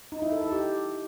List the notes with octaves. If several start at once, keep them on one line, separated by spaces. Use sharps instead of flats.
D#4
E4
A4
A4
G4